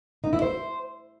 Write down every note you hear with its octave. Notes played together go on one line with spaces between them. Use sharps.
D#4
E4
C5